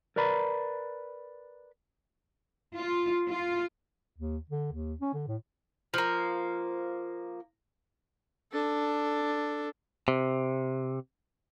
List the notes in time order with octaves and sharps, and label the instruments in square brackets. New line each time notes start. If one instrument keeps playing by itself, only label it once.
[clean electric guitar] A#4 B4 D5 A#5 B5
[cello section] F4
F4
[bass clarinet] D#2
D3
D#2
C#4
D3
A2
[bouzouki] F3 A#3
[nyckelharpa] D4 A4
[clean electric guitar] C3